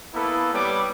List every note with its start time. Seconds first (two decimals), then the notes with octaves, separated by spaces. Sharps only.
0.14 A#3 B3 E4 A4
0.53 G3 B3 C#5 D6